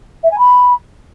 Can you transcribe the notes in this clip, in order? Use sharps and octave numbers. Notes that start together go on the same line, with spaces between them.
E5
G#5
B5